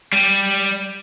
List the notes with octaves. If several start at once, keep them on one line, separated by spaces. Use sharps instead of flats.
G3